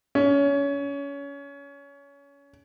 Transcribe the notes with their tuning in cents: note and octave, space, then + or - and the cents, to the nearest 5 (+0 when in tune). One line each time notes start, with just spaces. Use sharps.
C#4 +25